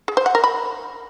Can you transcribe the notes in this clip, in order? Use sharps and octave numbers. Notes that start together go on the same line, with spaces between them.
G#4
C5
F#5
A#4
B5